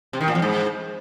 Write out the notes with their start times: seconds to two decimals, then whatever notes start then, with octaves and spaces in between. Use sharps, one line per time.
0.13 C3
0.21 D#3
0.28 A#2
0.35 F2
0.42 G#2